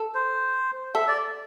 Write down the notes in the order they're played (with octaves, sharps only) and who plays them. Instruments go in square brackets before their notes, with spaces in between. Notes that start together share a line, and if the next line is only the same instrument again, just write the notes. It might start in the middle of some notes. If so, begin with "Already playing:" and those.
Already playing: [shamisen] A4
[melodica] C5
[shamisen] A4 [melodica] E5
[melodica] D5